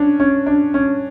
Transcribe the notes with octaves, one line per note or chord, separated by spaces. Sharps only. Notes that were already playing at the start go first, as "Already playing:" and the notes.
Already playing: C#4 D4
C#4
D4
C#4